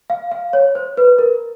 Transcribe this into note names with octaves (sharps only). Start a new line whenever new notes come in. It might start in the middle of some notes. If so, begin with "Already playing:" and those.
F5
F5
C#5
C5
B4
A#4